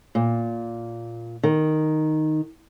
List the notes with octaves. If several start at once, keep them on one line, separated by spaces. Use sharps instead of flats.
A#2
D#3